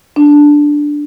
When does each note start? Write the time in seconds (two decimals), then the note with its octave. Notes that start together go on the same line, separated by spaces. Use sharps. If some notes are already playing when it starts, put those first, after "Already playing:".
0.16 D4